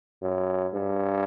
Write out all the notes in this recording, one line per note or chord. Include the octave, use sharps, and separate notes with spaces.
F#2
G2